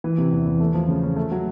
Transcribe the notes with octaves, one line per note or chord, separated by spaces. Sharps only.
E3
C3
E2
E2
A3
F3
C#3
C#4
A3
F#3